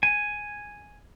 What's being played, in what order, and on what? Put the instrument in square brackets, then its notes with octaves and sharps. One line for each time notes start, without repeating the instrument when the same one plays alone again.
[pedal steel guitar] G#5